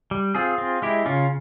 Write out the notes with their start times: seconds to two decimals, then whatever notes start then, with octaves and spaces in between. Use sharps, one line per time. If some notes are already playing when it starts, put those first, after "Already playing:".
0.11 G3
0.35 C4 F4 G#4
0.58 C4
0.82 G#3 E4 G4
1.06 C#3 C#4 F4